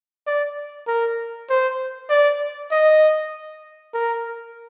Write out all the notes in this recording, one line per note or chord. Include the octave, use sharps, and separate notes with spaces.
D5
A#4
C5
D5
D#5
A#4